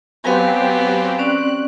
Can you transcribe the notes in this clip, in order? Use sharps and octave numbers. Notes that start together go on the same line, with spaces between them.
F#3 B3 C4 G4 F5 G#5
C4 C#4 D5 F#6